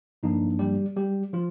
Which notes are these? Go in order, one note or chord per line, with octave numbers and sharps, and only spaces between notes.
G2 D3 F3 A#3 D4 D#4
G3 G4
G3 G4
F3 F4